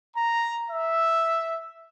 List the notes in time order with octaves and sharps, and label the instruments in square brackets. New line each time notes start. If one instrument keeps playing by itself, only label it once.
[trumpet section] A#5
E5